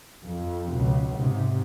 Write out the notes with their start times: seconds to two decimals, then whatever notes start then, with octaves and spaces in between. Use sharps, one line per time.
0.24 F2
0.70 C#2 B2
1.14 G#2 C3